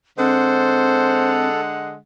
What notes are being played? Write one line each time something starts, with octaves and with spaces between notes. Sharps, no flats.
D3 G#3 C4 A4 C5 F#5